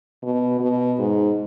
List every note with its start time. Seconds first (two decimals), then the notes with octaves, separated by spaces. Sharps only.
0.23 B2
0.60 B2
0.99 G#2